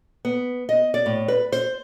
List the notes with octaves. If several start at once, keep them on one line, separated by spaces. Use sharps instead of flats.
B3
D#5
D5
A2
B4
C5